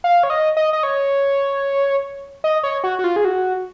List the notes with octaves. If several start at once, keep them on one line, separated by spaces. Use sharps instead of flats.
F5
C#5
D#5
D#5
D#5
C#5
D#5
C#5
F#4
F#4
F4
G#4
F#4